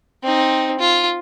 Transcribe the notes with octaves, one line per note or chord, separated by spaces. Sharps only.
C4 D#4
F4